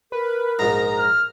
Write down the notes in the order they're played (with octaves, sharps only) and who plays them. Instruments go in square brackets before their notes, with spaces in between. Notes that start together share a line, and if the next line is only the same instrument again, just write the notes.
[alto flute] A#4 [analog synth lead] B4
[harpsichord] A#1 G#2 [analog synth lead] A#5
[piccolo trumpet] F6